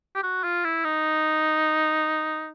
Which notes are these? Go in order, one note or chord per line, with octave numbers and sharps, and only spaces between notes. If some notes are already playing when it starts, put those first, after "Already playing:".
G4
F#4
F4
E4
D#4